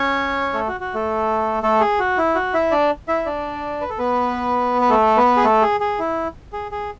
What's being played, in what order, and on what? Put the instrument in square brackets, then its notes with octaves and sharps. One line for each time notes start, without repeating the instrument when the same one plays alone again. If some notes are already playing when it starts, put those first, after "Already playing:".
Already playing: [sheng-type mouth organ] C#4 C#5
A3 A4
F#4
F#4
A3 A4
A3 A4
G#4
F#4
E4
F#4
E4 E5
D4 D5
E4 E5
D4 D5
B4
A4
B3 B4
B4
A3 A4
B3 B4
G#4
A3 A4
G#4
G#4
E4
G#4
G#4